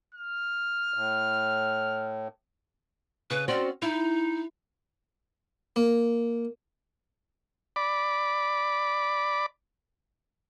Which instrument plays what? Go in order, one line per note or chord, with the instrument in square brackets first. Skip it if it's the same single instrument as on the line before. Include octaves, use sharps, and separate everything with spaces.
[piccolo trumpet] F6
[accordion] A2
[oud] C#3 [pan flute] B4
[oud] C4 C#4 F#4 [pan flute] D5
[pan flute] D#4 [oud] E4
[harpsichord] A#3
[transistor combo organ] D5 B5 D6